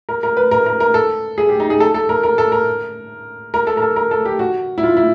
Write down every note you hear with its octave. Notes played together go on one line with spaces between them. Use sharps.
A#4
A#4
B4
A#4
A#4
A#4
A4
G#4
G4
D#4
G#4
A4
A4
A#4
A#4
A4
A#4
A#4
A4
A#4
A4
A#4
A4
G4
F#4
E4
F4
E4